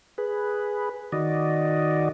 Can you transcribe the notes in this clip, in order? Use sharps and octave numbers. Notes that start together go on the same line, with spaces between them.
G#4 B4
D#3 F#4 D5 D#5